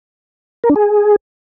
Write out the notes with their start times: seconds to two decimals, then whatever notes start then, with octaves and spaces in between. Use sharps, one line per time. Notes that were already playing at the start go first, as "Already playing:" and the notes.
0.64 A#4
0.70 D4
0.76 G#4